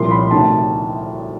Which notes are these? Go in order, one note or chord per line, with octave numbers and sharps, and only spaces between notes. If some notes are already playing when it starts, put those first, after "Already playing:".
Already playing: C2 A#2 F3 C6
B5
D2 C3 D#3 A5